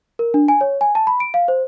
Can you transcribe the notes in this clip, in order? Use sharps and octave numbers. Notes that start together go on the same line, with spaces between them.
A#4
D4
G#5
C#5
G#5
A5
B5
D7
F5
C5